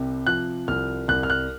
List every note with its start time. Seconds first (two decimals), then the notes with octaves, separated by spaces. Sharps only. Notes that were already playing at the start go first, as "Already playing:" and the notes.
Already playing: C2 C3
0.27 F3 F#6
0.68 C2 F6
1.08 C2 F#6
1.23 F6
1.30 F#6